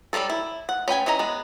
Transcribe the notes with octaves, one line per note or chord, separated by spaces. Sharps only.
F#3 G3 A#3 C4 A4
E4
F#5
C#4 B4 G5 G#5
E3 C#4 D#5 A#5
G#3 B3